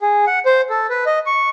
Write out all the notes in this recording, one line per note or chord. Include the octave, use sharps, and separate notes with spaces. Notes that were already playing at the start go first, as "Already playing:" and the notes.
G#4
F#5
C5
A4
B4
D#5
C#6